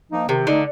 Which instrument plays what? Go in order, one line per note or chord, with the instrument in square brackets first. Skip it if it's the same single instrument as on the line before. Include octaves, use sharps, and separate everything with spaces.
[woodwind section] F3 A#3 D#4
[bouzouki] C3 [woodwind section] D#3
[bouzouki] D3 [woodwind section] A3 D#4